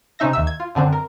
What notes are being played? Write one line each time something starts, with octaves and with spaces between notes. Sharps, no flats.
C3 C#4 D#4 E5 A#6
D#2 E5 E6
G#6
F4
F#2 D3 C4 D4
A#4